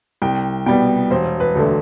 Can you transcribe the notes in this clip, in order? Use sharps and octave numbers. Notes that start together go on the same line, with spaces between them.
C2 G5
B2 G3 B3 G5
E1 C5
B4
D2 D3 A3